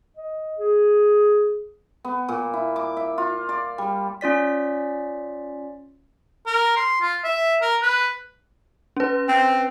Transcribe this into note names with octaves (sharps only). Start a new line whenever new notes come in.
D#5
G#4
B3
A#2
E4
D6
E5
F4
D5
G3
C#4 F4 D5 B6
A#4
C6
F4
E5
A#4
B4
C#4 B4
C4